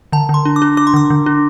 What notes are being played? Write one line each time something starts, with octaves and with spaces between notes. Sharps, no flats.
D3 A5
D3
C6
D4
D6
D4
D4 D6
C6
D3 D6
D3
D4